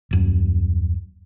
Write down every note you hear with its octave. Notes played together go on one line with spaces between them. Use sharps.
D#1 F#2